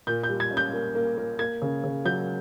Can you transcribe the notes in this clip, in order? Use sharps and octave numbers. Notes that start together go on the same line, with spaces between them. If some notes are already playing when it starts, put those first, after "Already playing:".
A#2 G6
G6
G3
G#6
C#4
G6
A#3
A#3
A#3
A#3 G#6
C#3
C#3
F#3 G6